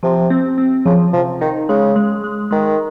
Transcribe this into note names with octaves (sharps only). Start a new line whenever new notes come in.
C3 F3
C4
C4
C#3 F3
C3 F3
D#3 D#4
C#3 G#3
G#3
G#3
D#3 G#3